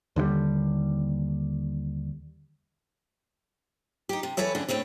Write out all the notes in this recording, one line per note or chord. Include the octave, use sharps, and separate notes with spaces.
D#2 D3 D#3 G3
D#4 G4
C3
E3 A4 B4 C#5 E5
F2 D3 C#4 D4
A2 A3 C4 C#5